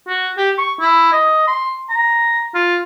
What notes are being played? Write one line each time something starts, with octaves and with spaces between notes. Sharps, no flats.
F#4
G4
C#6
E4
D#5
C6
A#5
F4